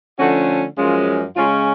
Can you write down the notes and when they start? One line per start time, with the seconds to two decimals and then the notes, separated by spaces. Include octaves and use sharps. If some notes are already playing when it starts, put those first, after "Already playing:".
0.19 D3 F3 A3 C#4 F#4
0.77 F#2 F3 G#3 C#4 F4
1.35 C#3 G#3 C#4 F4